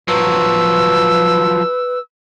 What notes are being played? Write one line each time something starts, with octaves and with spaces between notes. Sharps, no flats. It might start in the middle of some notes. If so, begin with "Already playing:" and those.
F3 F#3 B4 E6